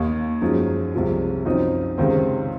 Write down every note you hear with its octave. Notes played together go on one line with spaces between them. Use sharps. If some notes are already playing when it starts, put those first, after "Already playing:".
Already playing: D#2 D#3 A#3 D#4
F#2 F3 G#3 D#4
C2 C3 F3 G#3
F#2 F3 C4 D#4
C#2 C3 D#3 G#3 C4